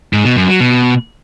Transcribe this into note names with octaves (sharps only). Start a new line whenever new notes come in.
G#2
B2
F#2
F#3
B2